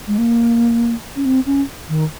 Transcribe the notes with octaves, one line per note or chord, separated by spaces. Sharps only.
G#3
A#3
C#4
C4
C#4
D#3